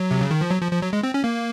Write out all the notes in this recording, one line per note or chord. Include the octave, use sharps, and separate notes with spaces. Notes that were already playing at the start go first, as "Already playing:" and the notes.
Already playing: F#3
C3
C#3
D#3
F3
F#3
F3
F3
F#3
G#3
C4
C#4
A#3